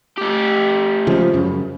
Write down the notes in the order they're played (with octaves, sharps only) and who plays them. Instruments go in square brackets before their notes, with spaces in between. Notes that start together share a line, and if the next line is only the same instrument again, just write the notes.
[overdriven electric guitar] A3 G4
[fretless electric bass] C#3 F3 G#3
F#2 C#3